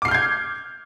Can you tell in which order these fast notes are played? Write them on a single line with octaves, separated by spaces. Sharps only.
D6 C7 F6 G6 G#6